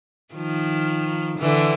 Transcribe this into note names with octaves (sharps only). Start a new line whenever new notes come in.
D#3 F3
D3 E3